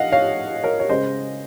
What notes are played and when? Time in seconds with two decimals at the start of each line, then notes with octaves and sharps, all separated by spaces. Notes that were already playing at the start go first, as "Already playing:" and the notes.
Already playing: F3 D#5 F5 F#5
0.12 C#5 F5
0.63 A#4 C#5
0.80 C#5
0.89 C#3 G#3 C#4 C5 D#5